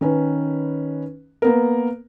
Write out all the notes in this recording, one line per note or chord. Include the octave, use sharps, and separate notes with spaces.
D#3 C#4 B4
A#3 B3 A#4